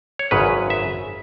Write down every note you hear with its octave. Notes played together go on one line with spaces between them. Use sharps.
C#5
G#1 F#2 C#3 B4
E5